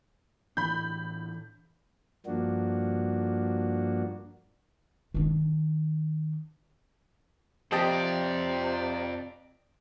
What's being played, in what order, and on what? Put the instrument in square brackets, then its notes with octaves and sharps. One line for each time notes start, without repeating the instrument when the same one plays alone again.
[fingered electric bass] A2 E3 D4 [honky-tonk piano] B5 G6
[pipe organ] G2 F3 A#3 D4 F#4
[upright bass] D#3 D4
[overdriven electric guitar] F2 [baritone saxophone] C3 [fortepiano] G4 D#5 A5 [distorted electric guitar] D5